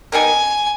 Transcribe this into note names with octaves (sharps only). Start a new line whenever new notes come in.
B3 D#4 G4 A#4 G#5